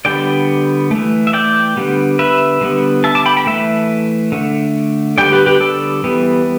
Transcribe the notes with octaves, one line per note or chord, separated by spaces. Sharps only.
D3 G3 B3 D5 G5
E3 A3
E5
D5 G5
D3 G3 B3
B4 E5
D3 G3 B3
E5 A5
A5 D6
G5 B5
G5 B5
E3 A3 E5 A5
D3 A3
D3 G3 B3 D5 G5
G4 B4
G4 B4
A4 D5
E3 G3 B3